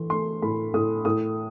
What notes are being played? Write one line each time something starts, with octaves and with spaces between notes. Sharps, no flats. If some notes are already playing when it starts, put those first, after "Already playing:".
Already playing: A2 E3 C6
A3 C6
A2 B5
A2 D#6
A2 D#6